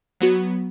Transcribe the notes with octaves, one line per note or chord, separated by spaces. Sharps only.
F#3 B3 F#4